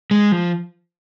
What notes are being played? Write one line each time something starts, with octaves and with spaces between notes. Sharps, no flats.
G#3
F3